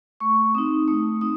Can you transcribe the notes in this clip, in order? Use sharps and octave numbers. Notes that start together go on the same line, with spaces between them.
A3 C#6
C4 D#4 D#6
A3 D#6
C4 D#4 D#6